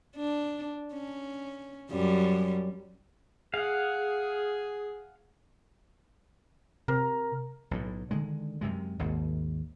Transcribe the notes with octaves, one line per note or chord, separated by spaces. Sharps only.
D4
C#4
F#2 G3
G#4 F5 F#5
C3 A#4
B1 A2
D3 D#3 G#3
F#2 C3 G#3
G#1 D#2